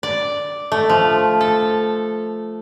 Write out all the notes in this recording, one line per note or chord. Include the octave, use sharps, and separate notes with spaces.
D5
A3
F3
A4